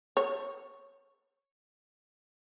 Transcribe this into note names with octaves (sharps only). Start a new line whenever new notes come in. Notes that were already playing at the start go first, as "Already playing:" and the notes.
C#5